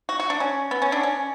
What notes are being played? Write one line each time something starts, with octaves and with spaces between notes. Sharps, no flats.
F#4
F#4
D4
C#4
B3
C#4
D4
C#4